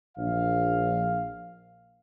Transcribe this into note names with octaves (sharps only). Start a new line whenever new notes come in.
A#1 F5